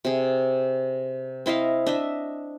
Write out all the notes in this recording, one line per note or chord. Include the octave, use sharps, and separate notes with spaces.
C3 G#4
C4 E4 D#5 F5
D4 D#5 E5